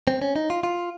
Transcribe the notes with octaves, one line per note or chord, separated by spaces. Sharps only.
C4
C#4
D#4
F4
F4